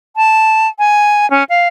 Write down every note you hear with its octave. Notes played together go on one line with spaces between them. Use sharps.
A5
G#5
C#4
F5